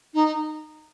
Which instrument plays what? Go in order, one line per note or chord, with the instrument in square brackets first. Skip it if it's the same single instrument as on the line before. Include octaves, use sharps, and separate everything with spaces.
[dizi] D#4